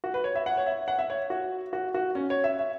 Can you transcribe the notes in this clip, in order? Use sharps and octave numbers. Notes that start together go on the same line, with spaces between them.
F#4
B4
C#5
E5
F#5
C#5
E5
F#5
E5
C#5
F#4
F#4
F#4
C#4
C#5
E5
E5